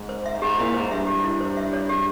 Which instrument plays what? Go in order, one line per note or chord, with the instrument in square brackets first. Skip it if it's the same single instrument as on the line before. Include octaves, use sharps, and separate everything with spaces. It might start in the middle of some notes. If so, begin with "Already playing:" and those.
Already playing: [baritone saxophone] G#2
[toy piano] C5
E5
[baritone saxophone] G#2 [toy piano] G4
[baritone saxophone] A#2 [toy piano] E4
[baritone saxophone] G#2 [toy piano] C5
[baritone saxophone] G2 [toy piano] E5
[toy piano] G4
E4
C5
E5
C#5
G4